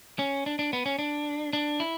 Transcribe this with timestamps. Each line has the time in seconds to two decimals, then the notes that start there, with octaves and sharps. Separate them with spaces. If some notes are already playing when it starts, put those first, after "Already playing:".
0.19 C#4
0.46 D4
0.59 D4
0.73 B3
0.86 C#4
0.99 D4
1.53 D4
1.80 E4